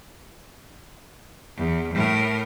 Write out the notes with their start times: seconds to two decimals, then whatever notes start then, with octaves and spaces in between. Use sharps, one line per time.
1.57 E2
1.94 A2 A#4